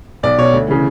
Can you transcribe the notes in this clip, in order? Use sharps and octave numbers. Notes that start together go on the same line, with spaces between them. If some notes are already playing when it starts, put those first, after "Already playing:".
B1 D5
B2 C#5
D2
C#3 E3